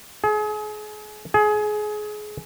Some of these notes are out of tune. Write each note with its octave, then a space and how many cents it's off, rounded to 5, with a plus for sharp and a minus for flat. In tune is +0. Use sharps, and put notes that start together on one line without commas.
G#4 +35
G#4 +25